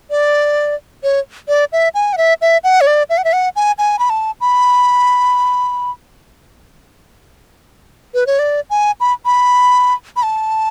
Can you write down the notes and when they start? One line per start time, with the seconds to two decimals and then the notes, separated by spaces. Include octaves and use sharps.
0.10 D5
1.03 C#5
1.48 D5
1.72 E5
1.94 G#5
2.13 F#5
2.18 E5
2.41 E5
2.64 F#5
2.81 C#5
2.87 D5
3.10 E5
3.18 F#5
3.24 E5
3.33 F#5
3.56 G#5
3.78 G#5
3.99 B5
4.10 A5
4.41 B5
8.14 B4
8.27 C#5
8.39 D5
8.70 G#5
9.00 B5
9.26 B5
10.16 B5
10.23 A5